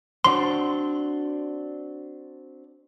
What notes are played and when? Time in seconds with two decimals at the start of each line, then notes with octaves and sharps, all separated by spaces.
0.24 C4 D4 F#4 C6